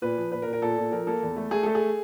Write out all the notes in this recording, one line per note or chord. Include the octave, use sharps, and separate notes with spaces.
A#2 B4
F3
A#2 B4
A#4
A#2
A#4
A#2 A4
A#2
F3 A#4
A#3 A4
E2
A3
A3 G#4
A3 A4
G#4